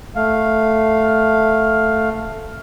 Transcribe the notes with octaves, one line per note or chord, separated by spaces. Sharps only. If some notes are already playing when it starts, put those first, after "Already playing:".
A3 F5